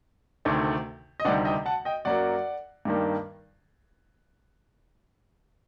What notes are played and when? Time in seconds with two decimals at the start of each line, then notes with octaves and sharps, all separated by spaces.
0.45 D2 C3 D#3 A3
1.20 D#5
1.25 D2 C3 D#3 G3 D5 F#5
1.45 D#5 G5
1.66 F#5 A5
1.85 D#5 G5
2.05 F#2 F#3 A#3 D5 F#5
2.85 G2 D#3 G3 A#3